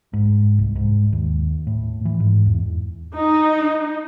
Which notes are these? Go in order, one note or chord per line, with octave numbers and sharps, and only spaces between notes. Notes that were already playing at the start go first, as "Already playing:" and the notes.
G#2
C2
G#2
D#2
A2
E3
G#2
E2
D#4